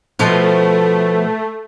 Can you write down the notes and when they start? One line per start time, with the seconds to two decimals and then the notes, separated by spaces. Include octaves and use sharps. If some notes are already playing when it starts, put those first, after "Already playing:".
0.19 B2 F3 A3 F4